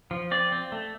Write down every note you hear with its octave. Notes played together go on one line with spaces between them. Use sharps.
F3
C4 D5
C4
A3